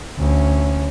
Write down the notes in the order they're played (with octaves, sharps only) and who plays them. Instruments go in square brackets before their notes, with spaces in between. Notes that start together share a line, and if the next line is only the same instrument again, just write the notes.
[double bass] D2 C#4